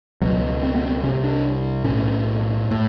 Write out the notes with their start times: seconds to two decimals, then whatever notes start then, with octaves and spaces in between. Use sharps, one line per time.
0.21 C#2 B2 F#3
0.63 C4
0.75 B3
0.86 C4
1.03 C3 C#4
1.08 C2
1.24 D4
1.84 B1 A2 C#4
2.71 A2